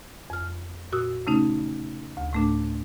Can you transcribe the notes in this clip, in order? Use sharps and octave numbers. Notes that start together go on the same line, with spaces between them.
F2 F6
A#2 F#4 D#6 E6
C#3 A3 C#4 D#4
D2
A2 A3 D4